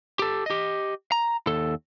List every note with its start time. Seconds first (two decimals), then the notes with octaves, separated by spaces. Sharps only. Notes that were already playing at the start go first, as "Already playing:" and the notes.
0.19 G4 A4
0.46 G4 D#5
1.12 A#5
1.47 D#2 A4